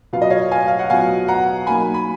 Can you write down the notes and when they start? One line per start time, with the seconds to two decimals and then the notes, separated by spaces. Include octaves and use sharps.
0.13 B2 F#3 B3 F4 F5
0.22 D#5
0.30 C#5 F5
0.51 F5 G#5
0.68 F5
0.79 F#5
0.90 B2 F#3 B3 F4 F5 G#5
1.28 F#5 A#5
1.66 F#3 A#3 D#4 G#5 B5
1.94 B5